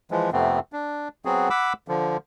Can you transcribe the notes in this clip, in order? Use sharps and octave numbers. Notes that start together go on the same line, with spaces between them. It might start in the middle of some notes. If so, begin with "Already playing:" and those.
E3 F3 G#3
F2 C3 A3 B3 C4
D4
F#3 B3 C4 F#4 G#4
F#5 B5 D6 E6
D3 F3